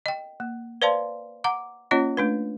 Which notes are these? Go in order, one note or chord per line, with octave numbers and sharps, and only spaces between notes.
D#5 G5
A#3
B4 C5 D5 F5 A5 C6
F#5 A#5 D6
A#3 C#4 F4 C#5 D#5
A3 D4 B4